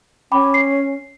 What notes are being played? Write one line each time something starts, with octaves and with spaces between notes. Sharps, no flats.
C#4 G5 B5 D6
C7